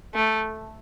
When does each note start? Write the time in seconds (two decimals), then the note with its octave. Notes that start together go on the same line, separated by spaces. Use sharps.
0.15 A3